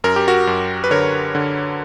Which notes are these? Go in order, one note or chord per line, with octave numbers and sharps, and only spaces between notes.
F#2 A#4
G4
F#4 A#4
F#2
B4
D3 A#4 C#5
D3